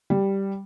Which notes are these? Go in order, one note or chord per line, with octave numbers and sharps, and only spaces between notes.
G3